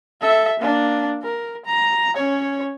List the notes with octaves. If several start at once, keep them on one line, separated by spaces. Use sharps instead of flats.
A4 E5
A#3 D4
A#4
A#5
C#4 C#5